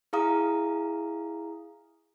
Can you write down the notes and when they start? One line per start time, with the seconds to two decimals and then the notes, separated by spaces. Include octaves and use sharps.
0.13 E4 G#4 F5 A#5 D#6